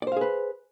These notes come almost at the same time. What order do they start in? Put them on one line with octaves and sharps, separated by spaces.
D5 C5 F5 G#4 B4